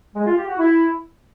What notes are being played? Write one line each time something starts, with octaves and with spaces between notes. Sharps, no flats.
G#3
F4
G4
F#4
E4